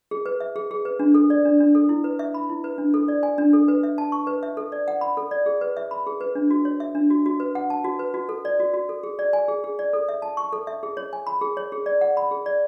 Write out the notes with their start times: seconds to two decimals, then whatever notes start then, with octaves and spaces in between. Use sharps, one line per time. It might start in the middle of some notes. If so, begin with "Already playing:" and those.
0.11 G#4
0.26 B4
0.40 E5
0.56 G#4
0.71 G#4
0.85 B4
0.99 D4
1.15 A4
1.30 D5
1.45 D4
1.60 D4
1.75 A4
1.89 E4
2.04 B4
2.19 E5
2.34 B5
2.49 E4
2.64 B4
2.78 D4
2.94 A4
3.08 D5
3.23 G#5
3.38 D4
3.53 A4
3.68 B4
3.83 E5
3.98 A5
4.12 C#6
4.27 B4
4.43 E5
4.57 A4
4.72 D5
4.88 F#5
5.01 B5
5.17 A4
5.31 D5
5.46 G#4
5.61 B4
5.77 E5
5.91 B5
6.07 G#4
6.21 B4
6.35 D4
6.50 F#4
6.65 C#5
6.80 E5
6.95 D4
7.10 F#4
7.26 F#4
7.40 B4
7.55 F#5
7.70 A5
7.84 F#4
7.99 B4
8.14 F#4
8.29 A4
8.45 D5
8.60 F#4
8.73 F#4
8.89 A4
9.03 G#4
9.19 D5
9.33 G#5
9.48 G#4
9.64 G#4
9.79 D5
9.93 A4
10.09 E5
10.22 A5
10.37 C#6
10.53 A4
10.67 E5
10.83 G#4
10.97 C#5
11.13 G#5
11.27 B5
11.41 G#4
11.57 C#5
11.72 G#4
11.86 D5
12.01 F#5
12.17 B5
12.31 G#4
12.46 D5